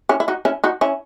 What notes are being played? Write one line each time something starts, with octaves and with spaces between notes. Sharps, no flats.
C#4 E4
E4
D#4 F#4
C#4 E4
D#4 F#4
C#4 E4